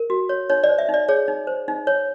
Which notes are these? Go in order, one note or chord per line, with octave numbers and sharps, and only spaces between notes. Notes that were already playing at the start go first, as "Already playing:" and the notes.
Already playing: A#4
F#4
C#5
D#4 C#5
D5
C5
E5
D#4 D5
G#4 C#5
D#4
C5
D#4
C#5